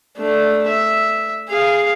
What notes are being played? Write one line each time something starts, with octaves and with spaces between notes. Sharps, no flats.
A3 D4
E5
G#4 F5